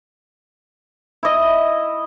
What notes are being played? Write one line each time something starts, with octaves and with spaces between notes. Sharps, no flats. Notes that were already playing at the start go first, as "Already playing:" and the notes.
E4 D#5